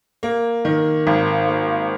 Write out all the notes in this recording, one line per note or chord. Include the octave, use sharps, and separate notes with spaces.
A#3
D#3
G#1
A#3